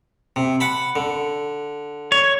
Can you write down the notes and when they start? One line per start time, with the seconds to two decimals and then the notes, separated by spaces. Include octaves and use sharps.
0.36 C3
0.60 F#5 A5 B5
0.96 D3
2.12 C#5